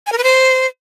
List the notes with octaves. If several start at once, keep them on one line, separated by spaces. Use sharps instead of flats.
G#5
A#4
B4
C5